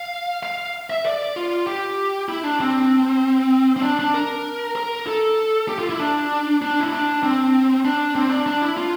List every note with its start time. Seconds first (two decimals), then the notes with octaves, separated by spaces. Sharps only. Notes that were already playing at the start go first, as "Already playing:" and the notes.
Already playing: F5
0.43 F5
0.90 E5
1.06 D5
1.36 F4
1.67 G4
2.29 E4
2.44 D4
2.60 C4
3.76 C4
3.83 D4
3.99 D4
4.14 A#4
4.76 A#4
5.07 A4
5.69 G4
5.79 F4
5.90 E4
6.00 D4
6.62 D4
6.80 E4
6.92 D4
7.23 C4
7.85 D4
8.15 C4
8.31 D4
8.46 D4
8.62 E4
8.77 F4